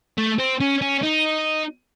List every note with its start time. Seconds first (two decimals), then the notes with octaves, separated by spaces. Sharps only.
0.18 A3
0.39 C4
0.60 C#4
0.82 C#4
1.03 D#4